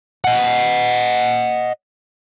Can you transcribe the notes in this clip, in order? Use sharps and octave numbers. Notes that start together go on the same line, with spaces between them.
D#5 F#5